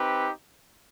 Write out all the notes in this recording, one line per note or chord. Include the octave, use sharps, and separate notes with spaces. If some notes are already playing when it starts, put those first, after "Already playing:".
Already playing: C4 D#4 G4 B4